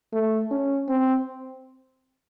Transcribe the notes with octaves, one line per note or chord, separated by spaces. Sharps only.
A3
C#4
C4